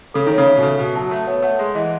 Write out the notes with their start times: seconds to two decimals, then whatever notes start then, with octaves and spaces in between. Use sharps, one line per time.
0.14 C#3 A4
0.27 D#3 C#5
0.38 C#3
0.47 E5
0.57 B2
0.62 C#3 A4
0.79 B2 E5
0.95 F#3 A5
1.11 A3 F#4
1.27 B3 C#5
1.43 A3 F#5
1.59 G#3 G#4
1.75 E3 D#5